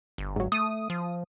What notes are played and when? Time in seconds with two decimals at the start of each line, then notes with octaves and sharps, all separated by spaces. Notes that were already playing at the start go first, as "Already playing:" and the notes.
0.18 G1
0.36 G#2 F#3
0.52 A3 D#6
0.90 F3